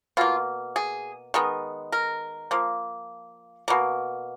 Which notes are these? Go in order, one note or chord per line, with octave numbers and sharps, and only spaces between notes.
B2 A#3 F4
G#4
D#3 G#3 B3
A#4
F3 A#3
B2 A#3